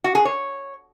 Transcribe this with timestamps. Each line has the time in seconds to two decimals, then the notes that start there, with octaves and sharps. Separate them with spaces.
0.04 F#4
0.15 G#4
0.25 C#5